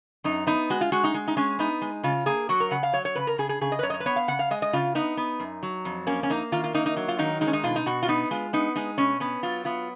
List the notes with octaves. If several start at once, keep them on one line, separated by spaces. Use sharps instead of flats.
F#2 D#4
B3 D#4
G#3 F#4
F4
G#3 F#4
D#4
G#3
D#4
G#3 C#4
B3 D#4
G#3
C#3 F4
A#3 G#4
F#3 F#4
A#4
C#3 F#5
F5
F#3 C#5
C#5
C#3 B4
A#4
C#3 G#4
G#4
C#3 G#4
D#5
B4
F#2 C#5
D#5
C#5
B4
B3 C#5
F5
C#3 F#5
F5
G#3 D#5
D#5
C#3 F4
B3 D#4
B3
F#2
F#3
F2
A#3 C#4
C#4
A#3 D#4
D#3 F4
F4
A#3 D#4
D#4
F#3
F4
D#3 D#4
G#3 D#4
C#4
D#4
B2 F4
D#4
B2 F#4
F4
B3 D#4
G#3 F4
B3 D#4
G#3 D#4
B2 C#4
B3 C#4
F#3 F4
B3 F4